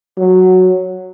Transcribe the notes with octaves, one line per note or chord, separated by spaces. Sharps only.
F#3